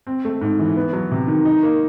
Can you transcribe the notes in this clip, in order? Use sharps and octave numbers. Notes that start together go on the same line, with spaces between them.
C4
A3
G#2
E3
B3
F#3
C3
D#3
D#4
A#3